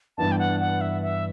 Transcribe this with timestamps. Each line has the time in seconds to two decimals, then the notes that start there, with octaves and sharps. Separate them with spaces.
0.18 G2 E3 B3 D4 A5
0.32 G5
0.39 F#5
0.60 F#5
0.81 E5
1.03 E5